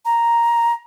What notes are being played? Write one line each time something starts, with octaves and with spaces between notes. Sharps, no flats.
A#5